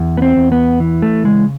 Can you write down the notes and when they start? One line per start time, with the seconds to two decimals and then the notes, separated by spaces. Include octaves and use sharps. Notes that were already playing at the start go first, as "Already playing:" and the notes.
Already playing: E2
0.17 B3
0.22 C4
0.36 E2
0.52 B3
0.80 E3
1.02 A3
1.24 C#3 G#3